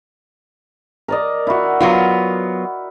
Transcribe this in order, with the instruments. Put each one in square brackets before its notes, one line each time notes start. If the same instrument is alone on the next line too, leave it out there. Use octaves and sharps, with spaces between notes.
[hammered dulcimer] A#4 D5 D#5
E4 F#4
[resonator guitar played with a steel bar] F#3 B3 F4